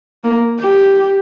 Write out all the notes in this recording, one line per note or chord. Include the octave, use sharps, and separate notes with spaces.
A#3
G4